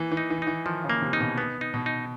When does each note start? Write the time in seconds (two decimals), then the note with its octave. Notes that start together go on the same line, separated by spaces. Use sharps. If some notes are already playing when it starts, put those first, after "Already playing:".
Already playing: E3 A#3
0.11 E3
0.17 D#4
0.30 E3
0.42 D#4
0.47 E3
0.66 D#3 F3
0.84 C#3
0.90 A#3
1.02 C3
1.13 D#4
1.20 B2
1.38 B3
1.61 D#4
1.74 B2
1.86 D#4